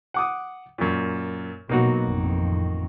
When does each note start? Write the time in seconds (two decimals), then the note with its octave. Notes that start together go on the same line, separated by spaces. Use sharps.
0.14 F#5 D6 D#6
0.78 F#2 A#2
1.69 B2 F#3 A#3 B3 D#4 F#4
2.03 A1 F2 D#3